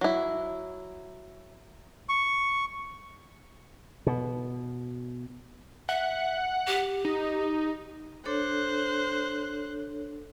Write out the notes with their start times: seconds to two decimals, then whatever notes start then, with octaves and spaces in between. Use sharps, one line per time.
0.01 F#3 E4
2.09 C#6
4.07 B2
5.89 E5 F#5
6.67 G4
7.05 D#4
8.25 D4 A4 C5 C#5 F#6